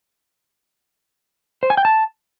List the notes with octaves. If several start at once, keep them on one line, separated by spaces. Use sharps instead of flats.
C5
G#5
G5
A5